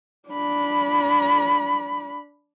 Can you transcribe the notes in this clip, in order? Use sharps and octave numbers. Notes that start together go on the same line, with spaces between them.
D4 B5